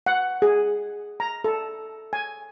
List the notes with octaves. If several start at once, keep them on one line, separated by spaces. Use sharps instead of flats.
F#5
G#4
A#5
A4
G#5